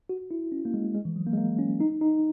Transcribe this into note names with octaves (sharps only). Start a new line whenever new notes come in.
F#4
E4
C#4
A#3
G#3
G#3
E3
F#3
A#3
G#3
A#3
C#4
D#4
D#4